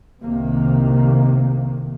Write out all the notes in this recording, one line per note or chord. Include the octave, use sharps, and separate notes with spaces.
C2 A2 C3 D#3 A#3